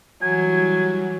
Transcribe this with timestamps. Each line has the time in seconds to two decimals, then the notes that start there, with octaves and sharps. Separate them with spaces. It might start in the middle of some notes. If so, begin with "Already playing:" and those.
0.22 E3 F#3 G3 G#5